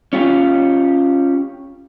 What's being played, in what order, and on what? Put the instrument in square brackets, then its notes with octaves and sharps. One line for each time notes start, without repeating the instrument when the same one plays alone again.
[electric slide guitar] C#4 F4 G4